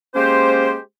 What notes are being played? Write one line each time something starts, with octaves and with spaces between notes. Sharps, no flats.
G#3 A#3 C#4 G4 C5